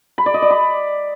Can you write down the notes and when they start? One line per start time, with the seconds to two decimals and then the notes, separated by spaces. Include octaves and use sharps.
0.18 B5
0.26 D5
0.34 D#5
0.42 D5
0.50 B5